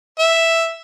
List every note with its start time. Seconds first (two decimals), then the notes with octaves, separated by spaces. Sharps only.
0.19 E5